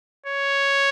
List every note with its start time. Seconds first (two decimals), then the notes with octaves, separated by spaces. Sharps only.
0.26 C#5